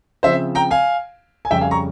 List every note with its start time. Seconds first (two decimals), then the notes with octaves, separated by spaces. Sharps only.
0.23 C#3 F3 C4 C5 E5
0.55 G5 A#5
0.71 F5 G#5
1.45 G#5
1.50 F2 C#3 G3 C#4 E5 G5
1.61 F5 G#5
1.71 A#5 C#6